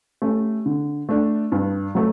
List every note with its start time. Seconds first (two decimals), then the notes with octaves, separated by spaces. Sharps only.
0.22 A3 C#4 G4
0.66 D3
1.09 A3 D4
1.52 G2
1.95 F#3 A3